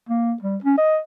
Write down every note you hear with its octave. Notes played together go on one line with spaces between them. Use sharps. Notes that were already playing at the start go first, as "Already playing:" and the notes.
A#3
G3
C#4
D#5